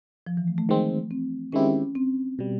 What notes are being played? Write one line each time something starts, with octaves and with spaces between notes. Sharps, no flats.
F3
E3
A3
A3
D#3 G#3 C4
C4
D#3 G#3 C4 C#4 E4 G4
C4
B2 G3